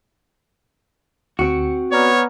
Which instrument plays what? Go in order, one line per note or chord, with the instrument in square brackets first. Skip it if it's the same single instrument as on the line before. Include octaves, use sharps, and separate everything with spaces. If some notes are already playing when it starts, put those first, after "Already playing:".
[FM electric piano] D2 C#7 [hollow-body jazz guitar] C4 F#4
[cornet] B3 [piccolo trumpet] C#5 [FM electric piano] D5 A#5 F6